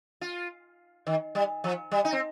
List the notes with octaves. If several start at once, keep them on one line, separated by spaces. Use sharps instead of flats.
F4
D#3
G3
F3
G3
D#4
C4